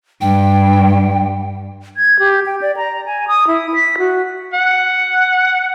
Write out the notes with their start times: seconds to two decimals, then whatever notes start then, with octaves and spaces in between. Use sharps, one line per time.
0.21 G2 G5
1.97 G#6
2.19 G4
2.46 G5
2.62 D5
2.77 A#5
3.06 G#5
3.28 D#6
3.48 E4
3.74 B6
3.98 F#4
4.53 F#5